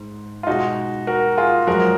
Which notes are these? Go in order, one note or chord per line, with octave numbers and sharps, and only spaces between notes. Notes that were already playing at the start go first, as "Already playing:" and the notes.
Already playing: G#2
F4
B2 G#3 D#4 F#4
F#4 A#4
F4 G#4
F#2 F3 G#3 F#4 A#4